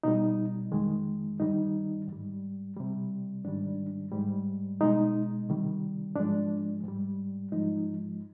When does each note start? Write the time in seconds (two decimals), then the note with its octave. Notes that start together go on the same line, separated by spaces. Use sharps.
0.03 B2 G3 D#4
0.72 F2 D#3 G#3
1.40 G2 D#3 G3 D#4
2.07 G#2 G3
2.77 C3 G3
3.45 G#2 D#3 G3 D4
4.11 G#2 G3
4.81 B2 G#3 D#4
5.49 C3 D#3 G3
6.16 G#2 F3 G#3 D4
6.84 G#2 G3
7.52 G#2 F3 G#3 D#4